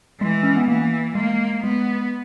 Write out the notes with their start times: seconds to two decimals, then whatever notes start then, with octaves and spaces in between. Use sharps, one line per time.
0.20 E3 G#3
0.43 C#4
0.56 B3
0.68 E3 A#3
1.15 G#3 A#3
1.63 G#3 B3